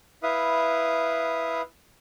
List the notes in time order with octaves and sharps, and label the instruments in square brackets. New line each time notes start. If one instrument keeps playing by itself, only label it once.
[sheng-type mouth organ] E4 B4 E5 F5 D#6